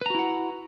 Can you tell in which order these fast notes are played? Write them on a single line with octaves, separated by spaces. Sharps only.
B4 A#5 F#4 E4 F#5